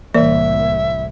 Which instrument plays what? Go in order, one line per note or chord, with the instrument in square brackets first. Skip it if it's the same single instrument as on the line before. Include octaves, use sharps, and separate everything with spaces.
[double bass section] C2 A2 [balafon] E3 D5 [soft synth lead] A#3 [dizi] E5